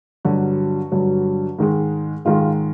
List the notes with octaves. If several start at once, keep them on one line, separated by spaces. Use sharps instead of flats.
G2 D3 F#3 F#4
G2 D3 F#3
G#2 D#3 G#3
G#2 D#3 G#3 F4